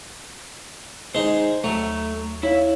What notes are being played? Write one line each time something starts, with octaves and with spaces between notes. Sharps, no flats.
G#3 D#4 C5
D#2 F#3 A3 A#5
E4 C#5 F5